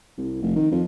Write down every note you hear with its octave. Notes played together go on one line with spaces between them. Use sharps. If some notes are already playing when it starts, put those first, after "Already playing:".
C2
F1
D#3
F2